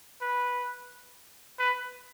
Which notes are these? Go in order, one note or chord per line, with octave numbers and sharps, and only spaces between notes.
B4
B4